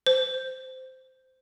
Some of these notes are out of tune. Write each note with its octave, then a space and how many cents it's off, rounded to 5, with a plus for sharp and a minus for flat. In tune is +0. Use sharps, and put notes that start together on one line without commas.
C5 -15